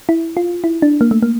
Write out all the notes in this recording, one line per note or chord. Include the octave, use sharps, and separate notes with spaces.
E4
F4
E4
D4
A#3
A3
A#3